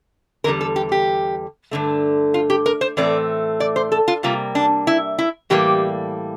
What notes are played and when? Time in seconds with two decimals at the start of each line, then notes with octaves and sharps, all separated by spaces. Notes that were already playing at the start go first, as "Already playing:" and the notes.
0.44 E2 D3 G3 A#4
0.61 A4
0.76 G4
0.92 G4
1.71 G2 D3 A3
2.34 F4
2.50 G4
2.66 A#4
2.81 C5
2.97 A2 E3 A3 C4 D5
3.60 D5
3.76 C5
3.92 A4
4.08 F4
4.23 C3 G3 A#3 F4
4.55 D4
4.87 E4
5.19 E4
5.50 A2 E3 G3 A#3 G4